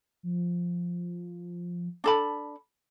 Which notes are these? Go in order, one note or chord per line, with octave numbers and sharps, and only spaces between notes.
F3
D4 A4 B5